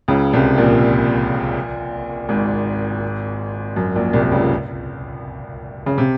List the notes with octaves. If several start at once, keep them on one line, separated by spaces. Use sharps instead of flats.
C#2 C#3
C2 C3
A#1 A#2
G#1 G#2
F#2
A#1 A#2
C2 C3
C#2 C#3
C#3
C3